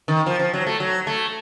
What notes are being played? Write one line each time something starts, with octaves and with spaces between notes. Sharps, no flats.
D#3
F3
F3
F#3
A3
F#3
A3